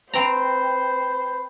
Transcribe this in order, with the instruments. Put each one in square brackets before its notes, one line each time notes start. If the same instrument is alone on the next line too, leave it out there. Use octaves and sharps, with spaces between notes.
[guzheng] C4 A#5 [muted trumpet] B4 [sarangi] C5